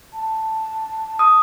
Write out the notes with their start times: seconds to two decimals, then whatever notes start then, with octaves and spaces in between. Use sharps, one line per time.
0.14 A5
1.19 D#6